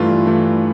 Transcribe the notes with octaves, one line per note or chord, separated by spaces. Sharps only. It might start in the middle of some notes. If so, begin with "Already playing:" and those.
Already playing: G2 E3 A3 D4 F4
G2 E3 A3 D4